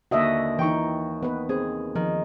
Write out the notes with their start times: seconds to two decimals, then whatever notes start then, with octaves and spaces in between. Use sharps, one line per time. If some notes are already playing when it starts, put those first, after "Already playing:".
0.11 D#2 D3 F#4 D#5 E5
0.59 E3 D#4 G5 C#6
1.23 B3 B4
1.49 C4 G#4
1.95 D#3 F3